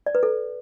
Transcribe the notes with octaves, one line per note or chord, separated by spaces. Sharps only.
D5
B4
A4